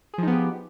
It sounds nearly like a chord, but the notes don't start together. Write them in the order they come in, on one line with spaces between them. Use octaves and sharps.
G#4 F3 D#4 B3 G4